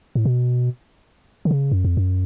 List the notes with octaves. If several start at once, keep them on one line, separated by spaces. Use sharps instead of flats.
A2
B2
D3
C#3
F#2
F2
F#2